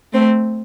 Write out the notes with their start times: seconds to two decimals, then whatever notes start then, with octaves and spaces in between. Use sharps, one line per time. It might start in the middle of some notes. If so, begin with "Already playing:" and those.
0.13 A3 C4